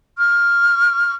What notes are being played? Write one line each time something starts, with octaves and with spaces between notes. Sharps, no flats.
C#6 F6